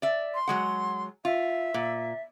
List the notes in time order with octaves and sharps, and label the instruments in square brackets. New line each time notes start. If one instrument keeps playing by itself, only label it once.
[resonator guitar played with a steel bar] D5 E5
[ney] C6
[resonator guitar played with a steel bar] F#3 G#3 F#5
[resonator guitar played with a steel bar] F4 [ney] E5
[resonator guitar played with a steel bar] A#2